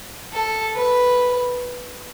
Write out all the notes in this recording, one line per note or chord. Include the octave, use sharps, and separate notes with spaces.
A4
B4